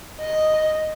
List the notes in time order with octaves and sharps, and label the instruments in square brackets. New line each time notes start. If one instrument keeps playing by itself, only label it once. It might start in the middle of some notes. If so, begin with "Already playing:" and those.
[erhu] D#5